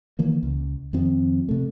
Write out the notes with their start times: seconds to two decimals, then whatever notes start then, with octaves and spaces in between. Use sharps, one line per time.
0.19 D#3 E3 A#3
0.43 C#2
0.93 F2 D#3 F3 C4
1.49 C3 A3